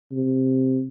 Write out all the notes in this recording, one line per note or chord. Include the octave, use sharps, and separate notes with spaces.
C3